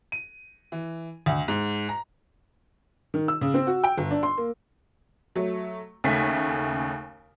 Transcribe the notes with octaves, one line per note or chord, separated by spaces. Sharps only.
D#7
E3
D2
G#2
A#5
D#3
E6
C#3
C4
F#4
G5
G1
D4
C6
A#3
F#3 A3
D#2 C#3 A3 G#5 B6